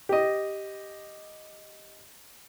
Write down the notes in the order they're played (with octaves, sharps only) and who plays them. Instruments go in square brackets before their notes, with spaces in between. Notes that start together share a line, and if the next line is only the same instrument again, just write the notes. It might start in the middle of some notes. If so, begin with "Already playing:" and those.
[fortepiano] G4 D#5